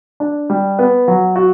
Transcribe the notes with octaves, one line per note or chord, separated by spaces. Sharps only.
D4
G3
B3
F#3
F#4